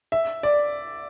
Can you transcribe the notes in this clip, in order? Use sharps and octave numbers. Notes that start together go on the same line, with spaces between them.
E5
D5